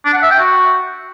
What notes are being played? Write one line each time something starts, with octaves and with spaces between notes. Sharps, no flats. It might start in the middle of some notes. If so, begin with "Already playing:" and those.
D4
F#5
E5
G5
F#4